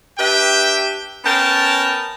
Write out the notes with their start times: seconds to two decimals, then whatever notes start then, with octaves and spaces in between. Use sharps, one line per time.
0.18 D4 G4 B4 E5 G5
1.25 B3 C#4 A#4 G5 A5